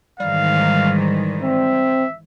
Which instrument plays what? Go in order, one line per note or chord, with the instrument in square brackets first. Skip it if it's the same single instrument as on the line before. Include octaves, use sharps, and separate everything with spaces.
[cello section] G#2 D#3 E3 [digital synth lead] G3 [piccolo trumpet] F5
[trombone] C4 [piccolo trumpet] E5